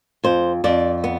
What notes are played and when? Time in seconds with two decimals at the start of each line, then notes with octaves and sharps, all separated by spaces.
0.24 F2 C5
0.64 F2 D5
1.04 B3